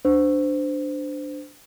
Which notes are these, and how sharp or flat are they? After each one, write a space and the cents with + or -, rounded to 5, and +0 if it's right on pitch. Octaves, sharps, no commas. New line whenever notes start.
D4 +0 C5 -25